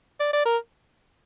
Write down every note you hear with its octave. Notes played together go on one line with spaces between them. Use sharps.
D5
D5
A#4